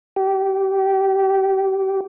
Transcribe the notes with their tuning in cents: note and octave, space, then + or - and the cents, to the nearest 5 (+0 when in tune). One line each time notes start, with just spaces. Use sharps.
G4 -25